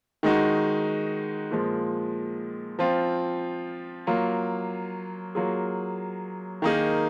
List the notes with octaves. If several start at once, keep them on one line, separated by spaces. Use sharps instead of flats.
D#3 G#3 D#4 F#4
A#2 F3 G#3
F3 C4 F4
F#3 A#3 F4
F#3 A#3 F4 G#4
D#3 A#3 D#4 G#4